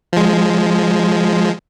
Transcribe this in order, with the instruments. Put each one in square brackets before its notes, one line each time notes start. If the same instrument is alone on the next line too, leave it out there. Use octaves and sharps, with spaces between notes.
[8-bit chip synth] F3 G#3